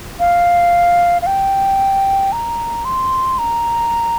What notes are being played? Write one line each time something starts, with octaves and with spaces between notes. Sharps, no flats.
F5
F5
G5
A#5
C6
A#5